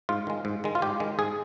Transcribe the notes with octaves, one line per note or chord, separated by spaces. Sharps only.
G#2 F4
D#3 G#3
G#2
D#3 G#3
F4
G#2 G4
D#3 G#3
G#2 G#4